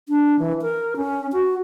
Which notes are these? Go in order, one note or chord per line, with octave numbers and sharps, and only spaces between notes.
D4
E3
A#4
C#4
F#4